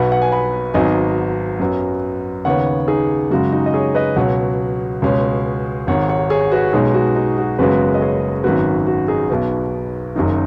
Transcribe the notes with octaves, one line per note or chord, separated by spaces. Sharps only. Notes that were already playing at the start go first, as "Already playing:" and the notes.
Already playing: B1 B2 B3 F#5 B5
F#5
G#5
F#5 B5
G#1 G#2 F#3 B3 D#5 G#5
F#2 F#3 B3
D#2 C#3 B3 C#5 F#5
D#4 G#4
F#2 C#3 G#3 F#4
D#4
D#5
G#4 C#5
B4 D#5
C#2 B2 F#3 C#5 F#5
C#2 B2 G#3 C#4
G#1 G#2 D#3 C#5 F#5
C#5 F#5
G#4 C#5
F#4 B4
B1 B2 G#3 C#4 D#4 G#4
F#4
D#4
F#4
F#1 F#2 C#3 G#3 B3 F#4 B4
D#5
G#4 C#5
G#1 F#2 D#3 B3 F#4 B4
F#4
D#4 G#4
B1 B2 B3
F#1 F#2 D#3 D#4